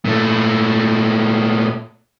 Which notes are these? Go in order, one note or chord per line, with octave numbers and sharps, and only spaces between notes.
A#2 A3